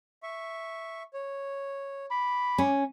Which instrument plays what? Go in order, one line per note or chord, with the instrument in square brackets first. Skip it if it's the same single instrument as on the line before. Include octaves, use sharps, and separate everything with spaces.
[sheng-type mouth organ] E5 C#6
C#5
[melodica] B5 [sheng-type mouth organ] D6
[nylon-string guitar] C#4